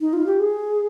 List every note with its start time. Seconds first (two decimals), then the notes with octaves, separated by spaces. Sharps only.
0.01 D#4
0.13 F4
0.26 G4
0.40 G#4